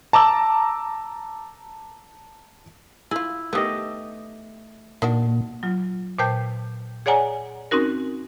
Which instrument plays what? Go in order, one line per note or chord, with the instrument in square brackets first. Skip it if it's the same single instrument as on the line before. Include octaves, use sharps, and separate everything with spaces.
[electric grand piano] A5 A#5 D6 E6
[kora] E4 [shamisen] F4 G#4
[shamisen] D#3 B3 [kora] A3 G4 D#5
[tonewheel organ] A#2 [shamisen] D#3 D4 F#4
[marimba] F#3 F4
A#2 B4 C5 G5 A5 G6
G#4 C#5 D5 F#5 G#5 A#5
C4 C#4 D#4 F#4 A#4